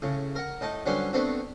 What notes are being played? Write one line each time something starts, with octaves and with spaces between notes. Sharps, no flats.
A2 C#3
A#4 F#5
A2 D#4 A5
D3 F#3 G3 C#4 B4 C5
A3 B3 C4 D4 F#4